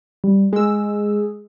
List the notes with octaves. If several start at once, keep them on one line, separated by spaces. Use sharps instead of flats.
G3
G#3 G#4 E6